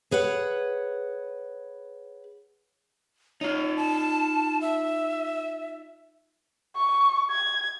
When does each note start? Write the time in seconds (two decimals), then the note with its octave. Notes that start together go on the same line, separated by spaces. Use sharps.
0.11 G#4 B4 C#5 F#5
3.41 D#4 F4 C#5
3.77 A5
4.61 E5
6.76 C#6
7.31 G#6